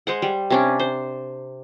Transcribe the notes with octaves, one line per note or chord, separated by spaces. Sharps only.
G#3 C5 F#5
G3
C3 C#4 D4
C5